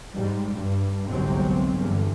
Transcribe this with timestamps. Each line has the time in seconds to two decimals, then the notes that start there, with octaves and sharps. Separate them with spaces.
0.15 G#2 G3
0.54 G2
1.09 G1 C2 G#2 C3 F#3 C4
1.77 E2 G2 D3